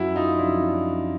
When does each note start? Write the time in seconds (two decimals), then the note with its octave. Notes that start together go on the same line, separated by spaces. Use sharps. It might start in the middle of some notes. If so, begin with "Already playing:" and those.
Already playing: F#2 E4 F#4
0.16 D#4 F4
0.38 C#3 F3 D4 E4
0.62 D4